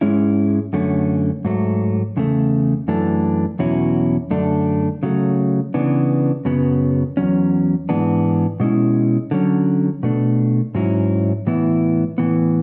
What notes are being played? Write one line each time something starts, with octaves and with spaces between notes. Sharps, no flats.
G#2 G#3 C#4 E4
F#2 D3 A3 C#4
G#2 F#3 A3
E2 C#3 A3
F#2 E3 A3 D4
E2 B2 F#3 C#4 E4
F#2 D3 A3 D4
C#3 F#3 A3
C#3 E3 B3 D4
F#2 C#3 F#3 B3
E2 B2 F#3 C#4
G#2 E3 B3 D4
B2 G#3 C#4 E4
D3 F#3 C#4
B2 A3 D4
G#2 F#3 C#4 E4
A2 E3 B3 E4
A2 E3 B3